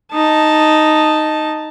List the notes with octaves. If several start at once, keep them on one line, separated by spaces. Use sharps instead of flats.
D#4 A5